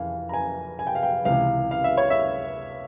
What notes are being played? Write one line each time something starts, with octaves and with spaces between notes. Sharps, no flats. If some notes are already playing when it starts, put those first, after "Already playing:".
Already playing: F2 E3 F5 G#5
A#5
G#5
G#5
G5
F5
G5
C#2 C3 E3 F5
F5
E5
C#5
E5